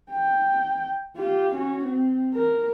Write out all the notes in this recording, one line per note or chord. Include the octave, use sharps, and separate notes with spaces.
G5
F4 G4
C#4 F#4
C4
A#4